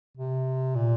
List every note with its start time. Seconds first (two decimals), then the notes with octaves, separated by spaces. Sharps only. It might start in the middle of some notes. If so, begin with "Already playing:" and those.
0.17 C3
0.75 A#2